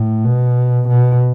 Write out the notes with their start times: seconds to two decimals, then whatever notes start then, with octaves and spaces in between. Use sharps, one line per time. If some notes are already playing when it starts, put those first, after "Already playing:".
Already playing: A2
0.25 B2
0.88 B2